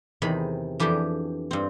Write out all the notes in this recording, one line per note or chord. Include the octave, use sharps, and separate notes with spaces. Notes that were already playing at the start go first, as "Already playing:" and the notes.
E2 C3 D#3 G#4 B5
F2 E3 D4 G4 G#4 G5
G2 C4